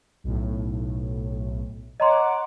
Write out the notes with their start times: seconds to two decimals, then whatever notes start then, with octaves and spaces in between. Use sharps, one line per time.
0.24 B1 A2
2.00 C#5 D#5 F#5 A#5 C6 D6